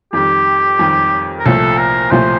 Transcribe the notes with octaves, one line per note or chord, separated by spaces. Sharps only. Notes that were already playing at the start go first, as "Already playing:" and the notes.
F2 D#3 G3 G4
F2 D#3 G3
A#4
C2 A#2 F3 A3 A4
A#4
C2 A#2 F3 A3 C5